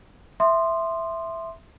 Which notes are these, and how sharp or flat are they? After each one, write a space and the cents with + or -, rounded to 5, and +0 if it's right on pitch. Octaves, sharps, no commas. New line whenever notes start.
E5 +0 C6 +0 D#6 -40